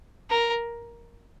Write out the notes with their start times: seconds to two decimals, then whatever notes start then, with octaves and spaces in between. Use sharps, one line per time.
0.30 A#4